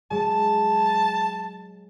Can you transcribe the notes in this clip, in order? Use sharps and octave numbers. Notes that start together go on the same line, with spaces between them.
F#3 G#3 A5